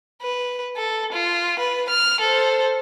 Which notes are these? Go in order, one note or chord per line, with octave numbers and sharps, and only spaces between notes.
B4
A4
F4
B4
F6
A4 C5